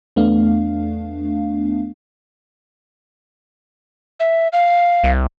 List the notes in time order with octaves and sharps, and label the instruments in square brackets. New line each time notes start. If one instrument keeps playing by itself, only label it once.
[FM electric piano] E2 A3 B3 D4 F5
[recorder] E5
F5
[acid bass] C2